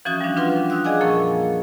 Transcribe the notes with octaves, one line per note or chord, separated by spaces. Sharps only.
E3 F3 C#4 F#4 D#6 G6
G3 D4
D4 F4 B4 F#5 C6
F5 D#6 E6 F#6
G#4 D5 D#5 F#5 G#5 D6
F2 A#2 F3 A#3 C#6 A6